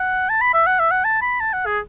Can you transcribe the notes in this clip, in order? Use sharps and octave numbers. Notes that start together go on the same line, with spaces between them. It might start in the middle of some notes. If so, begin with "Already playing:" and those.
Already playing: F#5
A5
B5
E5
F#5
E5
F#5
A5
B5
A5
F#5
G#4